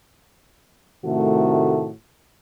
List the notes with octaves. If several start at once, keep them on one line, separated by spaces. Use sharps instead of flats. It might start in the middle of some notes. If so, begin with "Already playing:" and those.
A2 C3 D#3 A3 F#4